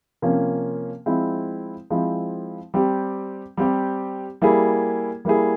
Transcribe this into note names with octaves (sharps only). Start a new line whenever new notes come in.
C3 F3 A#3 C#4
F3 G#3 C4 E4
F3 G#3 C4 E4
G3 C4 G4
G3 C4 G4
G3 A#3 E4 G#4
G3 A#3 E4 G#4